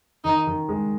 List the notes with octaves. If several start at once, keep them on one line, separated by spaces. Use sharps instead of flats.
D#3 D#4
D#3
G#3